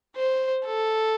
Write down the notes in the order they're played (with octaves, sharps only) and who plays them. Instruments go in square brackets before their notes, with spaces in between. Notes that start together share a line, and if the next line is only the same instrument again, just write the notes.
[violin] C5
A4